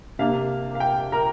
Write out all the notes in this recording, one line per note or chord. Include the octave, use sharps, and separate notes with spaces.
C3 A#3 D4 F5
F5
G5
A#4 A#5